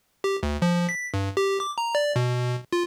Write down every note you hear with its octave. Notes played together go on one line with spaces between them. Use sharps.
G4
D2
F3
B6
G2
G4
D6
A#5
D5
B2
F4